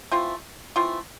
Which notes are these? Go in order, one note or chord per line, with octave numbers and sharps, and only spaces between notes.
E3 A3 C4 F4
E3 A3 C4 F4